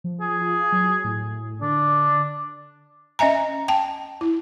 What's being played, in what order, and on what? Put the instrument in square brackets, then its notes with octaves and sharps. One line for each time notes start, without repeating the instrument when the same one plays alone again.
[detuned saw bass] F3
[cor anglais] G#4
[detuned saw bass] F4
F#3
A2
[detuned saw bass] D3 [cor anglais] D4
[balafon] C#4 D#5 E5 G#5 A#5
G5 A5
E4